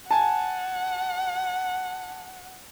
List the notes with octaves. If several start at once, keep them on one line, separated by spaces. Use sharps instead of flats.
F#5 G#5 A5